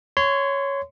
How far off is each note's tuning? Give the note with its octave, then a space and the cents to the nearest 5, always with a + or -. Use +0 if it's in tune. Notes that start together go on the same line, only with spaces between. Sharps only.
C#5 +0 C6 -25